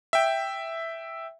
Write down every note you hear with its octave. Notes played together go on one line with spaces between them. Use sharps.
E5 G5